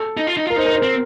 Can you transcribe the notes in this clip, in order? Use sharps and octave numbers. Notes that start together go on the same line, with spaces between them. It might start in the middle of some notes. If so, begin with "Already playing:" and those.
Already playing: A4
D#4
F4
D#4
F4 A#4
D#4 C5
A#4
C5
C4 A#4